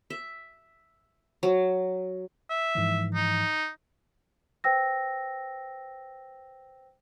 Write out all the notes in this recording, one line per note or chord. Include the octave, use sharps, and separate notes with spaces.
E5
F#3
E5
G#2 E3 F3
D#4
B4 C5 G5 E6 A#6